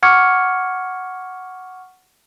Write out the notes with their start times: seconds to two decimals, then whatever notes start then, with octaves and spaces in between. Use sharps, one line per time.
0.03 F#5 C#6 D6 F6 G#6 C#7